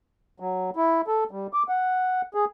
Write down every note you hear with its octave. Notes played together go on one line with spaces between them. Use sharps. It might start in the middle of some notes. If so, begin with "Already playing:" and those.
F#3
E4
A4
G3
D6
F#5
G#4